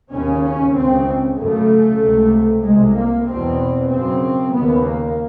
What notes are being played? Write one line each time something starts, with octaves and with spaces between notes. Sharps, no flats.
D#2 C#3 C#4
C#4
C#2 C#3 C4
F#2 C#3 A3
C#2 C3
C2 C3 G#3
A#3
E2 B2 C4
F#2 C#3 C4
D#2 C#3 B3
A#3